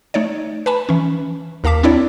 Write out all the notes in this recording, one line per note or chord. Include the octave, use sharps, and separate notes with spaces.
A3 D#4 C#5 D5
B4 G#5 A5 B5
E3 C#4
D#2 A#4 F5 A5 D6 B6
C4 D4 E4 C#5 D5